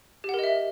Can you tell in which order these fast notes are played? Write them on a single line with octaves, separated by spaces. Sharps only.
G4 F#5 A#4 D#5 E5